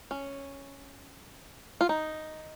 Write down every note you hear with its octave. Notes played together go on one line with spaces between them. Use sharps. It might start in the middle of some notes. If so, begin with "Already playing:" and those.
C#4
F4
D#4